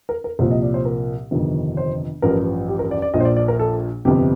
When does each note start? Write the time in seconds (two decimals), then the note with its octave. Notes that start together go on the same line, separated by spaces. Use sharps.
0.09 A#4
0.24 A#4
0.39 C2 A#2 F3 C5
0.51 D#5
0.63 D5
0.74 C5
0.85 A#4
1.31 G1 F2 C3 D#3
1.77 C5
2.22 A1 G2 F3 A#4
2.68 G4
2.79 A#4
2.91 D5
3.02 D5
3.14 A#1 A#2 F3 D#5
3.20 C5
3.25 D5
3.37 D5
3.48 A#4
3.59 A4
4.05 G1 F2 C3 G4